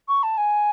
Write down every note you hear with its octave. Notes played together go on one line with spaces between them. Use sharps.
C#6
A5
G#5